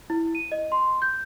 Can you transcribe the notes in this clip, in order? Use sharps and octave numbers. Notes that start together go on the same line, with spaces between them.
E4
D#7
D#5
C6
G6